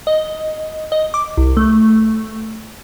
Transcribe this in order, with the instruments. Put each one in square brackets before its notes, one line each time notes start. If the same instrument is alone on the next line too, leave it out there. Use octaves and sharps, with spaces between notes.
[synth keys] D#5
D#5
D6
C2
A3